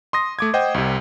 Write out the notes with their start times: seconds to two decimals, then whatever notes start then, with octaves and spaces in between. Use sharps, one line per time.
0.13 C6 D#6 A#6
0.39 A3 D6 G#6
0.54 C5 D#5 F#5 G5
0.74 C2 C3